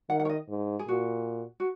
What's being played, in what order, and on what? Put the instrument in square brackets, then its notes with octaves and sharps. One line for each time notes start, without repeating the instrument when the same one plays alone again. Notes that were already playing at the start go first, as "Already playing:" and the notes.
[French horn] D#3 [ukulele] F#5
[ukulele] F#5
C#5
D#5
[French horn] G#2
[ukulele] G#4
[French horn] A#2 [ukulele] F#4
[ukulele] F#4